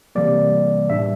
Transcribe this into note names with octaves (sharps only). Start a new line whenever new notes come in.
C3 E3 G3 A#3 D5
A2 G3 D4 E5